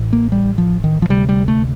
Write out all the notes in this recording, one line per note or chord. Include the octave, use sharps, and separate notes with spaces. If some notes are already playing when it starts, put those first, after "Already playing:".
Already playing: A1 A2
A#3
G3
F3
D#3
F3
D2 C3 G3
G3
A3